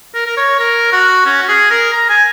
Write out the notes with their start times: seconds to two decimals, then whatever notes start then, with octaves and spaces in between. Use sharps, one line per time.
0.14 A#4
0.26 A#4
0.37 C#5
0.59 A#4
0.92 F#4
1.26 C#4
1.43 F#4
1.48 G#4
1.70 A#4
1.93 A#5
2.09 G#5